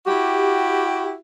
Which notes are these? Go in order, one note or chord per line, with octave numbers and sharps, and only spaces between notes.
E4 F#4 G4